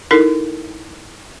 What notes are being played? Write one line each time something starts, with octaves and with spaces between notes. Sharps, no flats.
D#4 E4 A4 A#4